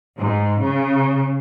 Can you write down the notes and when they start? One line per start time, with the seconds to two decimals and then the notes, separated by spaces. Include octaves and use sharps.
0.18 G#2
0.61 C#3